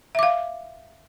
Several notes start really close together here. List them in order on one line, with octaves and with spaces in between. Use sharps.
E5 D6 F5